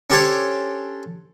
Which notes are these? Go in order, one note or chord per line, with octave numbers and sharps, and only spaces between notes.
C#4 D4 G4 A4 C5 C#5